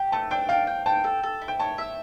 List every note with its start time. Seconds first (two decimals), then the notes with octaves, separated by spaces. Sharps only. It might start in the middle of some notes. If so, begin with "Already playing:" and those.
Already playing: G4
0.12 A3 A5
0.31 D4 G5
0.49 F5 G5
0.67 G5
0.86 G5 A5
1.04 A4
1.23 A4
1.42 E4
1.48 G5
1.59 C#5 A5
1.78 E5